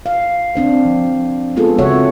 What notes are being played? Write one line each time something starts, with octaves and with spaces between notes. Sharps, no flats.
F5
C4 D4 C5
F3
G#3 B3 F4 G#4 A4
C#3 C4 F#4 C#5 E5 F#5